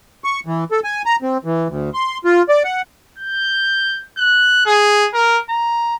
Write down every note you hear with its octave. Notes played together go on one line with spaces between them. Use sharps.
C#6
E3
A4
G#5
A#5
C4
E3
D2
C6
F4
D5
F#5
G6
F#6
G#4
A#4
A#5